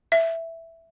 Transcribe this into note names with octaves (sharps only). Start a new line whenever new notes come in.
E5